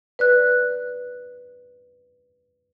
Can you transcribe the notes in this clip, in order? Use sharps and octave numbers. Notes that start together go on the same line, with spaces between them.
B4 D5 F#6